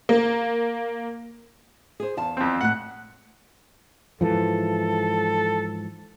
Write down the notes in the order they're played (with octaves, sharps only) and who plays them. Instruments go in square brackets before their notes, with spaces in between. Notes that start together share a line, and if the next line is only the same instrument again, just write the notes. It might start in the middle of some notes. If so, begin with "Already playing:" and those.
[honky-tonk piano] A#3
[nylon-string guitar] G#4 C5
E2 F5 A5
[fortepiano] F2 C4
[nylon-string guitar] A2 A3 [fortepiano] F#5 F#6
[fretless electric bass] G#2 E3 F3 [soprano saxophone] A4